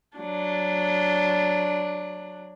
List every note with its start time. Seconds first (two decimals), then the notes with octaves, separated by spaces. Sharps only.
0.17 F#3 D4